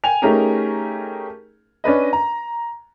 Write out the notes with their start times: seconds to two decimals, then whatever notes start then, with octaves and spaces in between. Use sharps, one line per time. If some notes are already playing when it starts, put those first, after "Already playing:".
0.04 G5 G#5 F7
0.22 A3 C#4 D#4 G4 G#4 A#4
1.84 C#4 D4 B4 D#5
2.13 A#5